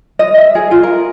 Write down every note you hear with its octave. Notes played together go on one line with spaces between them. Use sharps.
D#5
E5
G#4
F4
A#4